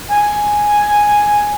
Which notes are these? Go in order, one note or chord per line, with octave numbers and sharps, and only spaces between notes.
G#5